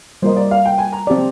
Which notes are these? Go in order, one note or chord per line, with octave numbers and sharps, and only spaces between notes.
G3 A#3 F4 A#4 C5 D#5
D5
F5
G5
G#5
A#5
C4 G4 D5